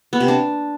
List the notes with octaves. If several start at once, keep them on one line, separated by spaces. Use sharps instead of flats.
B3
C3
D4